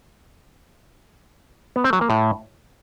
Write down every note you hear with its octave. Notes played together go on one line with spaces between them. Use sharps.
B3
C4
F#3
A#3
A2